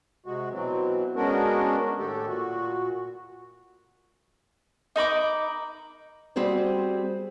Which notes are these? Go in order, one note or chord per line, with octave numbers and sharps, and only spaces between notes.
C3 G#3 F#4
B2 E3 F#3 C4
G#3 B3 C#4 D4 F#4 A#4
A2 D#3 A3 G4 A4
A#2 F#4
D#4 A#4 B5 D6
G3 C4 F#4 G#4 C5